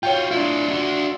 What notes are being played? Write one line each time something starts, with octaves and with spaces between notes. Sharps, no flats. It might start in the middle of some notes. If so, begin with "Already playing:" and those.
F4 F#4 C#5 G5
D4 E4 F4
D4 F#4